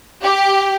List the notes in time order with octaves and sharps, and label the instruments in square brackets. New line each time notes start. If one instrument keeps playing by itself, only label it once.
[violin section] G4